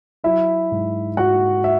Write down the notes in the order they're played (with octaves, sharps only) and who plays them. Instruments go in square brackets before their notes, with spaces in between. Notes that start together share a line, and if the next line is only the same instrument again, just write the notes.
[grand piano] F#3 E4 E5
G#2
G#2 F#4 F#5
E5